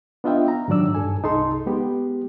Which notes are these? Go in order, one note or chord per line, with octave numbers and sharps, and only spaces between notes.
B3 D4 F4 D#5 E5 G5
A#5
G#2 D#3 F#3 D4 D5 E6
G2 A4 G#5
C2 D#4 G#4 A4 C6
G#3 B3 G4